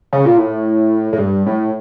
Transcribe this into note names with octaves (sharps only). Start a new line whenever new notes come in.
C#3
A#2
A2
A2
G2
A2